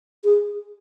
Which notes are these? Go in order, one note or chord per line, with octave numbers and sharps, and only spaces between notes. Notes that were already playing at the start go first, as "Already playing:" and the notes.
G#4